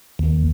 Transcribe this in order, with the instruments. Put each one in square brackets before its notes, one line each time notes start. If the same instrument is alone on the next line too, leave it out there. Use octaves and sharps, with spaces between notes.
[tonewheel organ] D#2